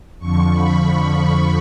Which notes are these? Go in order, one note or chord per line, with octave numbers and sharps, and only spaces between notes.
F2 D3 F3 C#6
B5